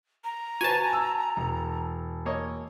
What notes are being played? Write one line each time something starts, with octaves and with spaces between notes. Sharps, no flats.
A#5
F#4 B4 C5 G#5 A5
E6
E1
A#3 C#5 D#5